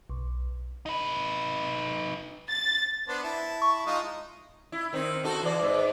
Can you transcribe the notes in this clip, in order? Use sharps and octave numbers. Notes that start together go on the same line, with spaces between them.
B1
D#4 B4
A6
B3 D4 C5
E4 A5
C#6
G#3 D#4 F4
E4
D#3 C4 D#4
D#4 F#4 A4
E3 D5
G#2